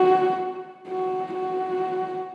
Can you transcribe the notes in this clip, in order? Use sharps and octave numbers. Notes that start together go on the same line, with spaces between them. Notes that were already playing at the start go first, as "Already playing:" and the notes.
Already playing: F#4
F#4
F#4